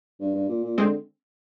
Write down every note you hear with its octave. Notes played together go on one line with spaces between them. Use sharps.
G2
G2
A#2
A#2
D3 G#3 C4